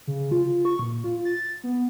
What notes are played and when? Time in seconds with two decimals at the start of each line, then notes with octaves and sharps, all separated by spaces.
0.07 C#3
0.31 F4
0.65 C#6
0.79 A#2
1.04 F4
1.25 A6
1.64 B3